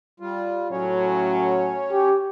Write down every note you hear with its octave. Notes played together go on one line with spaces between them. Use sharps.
G3 F4
A2 F#3 C#4 C#5
G4